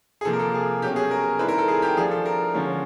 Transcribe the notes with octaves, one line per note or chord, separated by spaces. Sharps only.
G#4
C3 F3 A#3 A4
A#4
A4
G#4
B2 F#3 A3 C#4 G4
G#4
A#4
D#3 G3 C4 E4 B4
A#4
A4
G#4
G4
F3 A3 D4 G#4
A4
A#4
D3 F3 G#3 C#4